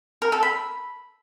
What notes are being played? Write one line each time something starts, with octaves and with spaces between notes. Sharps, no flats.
A#4
A4
B5